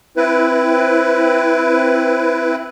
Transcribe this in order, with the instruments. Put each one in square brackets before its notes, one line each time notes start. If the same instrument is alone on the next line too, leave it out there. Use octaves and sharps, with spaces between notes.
[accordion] C4 E4 B4